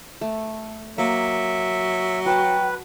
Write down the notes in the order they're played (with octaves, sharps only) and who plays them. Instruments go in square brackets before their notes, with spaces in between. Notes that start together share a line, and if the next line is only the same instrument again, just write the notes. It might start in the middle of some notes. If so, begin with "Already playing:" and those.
[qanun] A3
[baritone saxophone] F#3 [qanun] A#3 [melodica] E5
[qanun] F#4 A5 [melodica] B4 [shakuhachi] G5